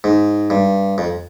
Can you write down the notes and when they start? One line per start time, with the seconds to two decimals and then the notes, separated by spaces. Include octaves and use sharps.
0.04 G#2
0.50 G2
0.98 F2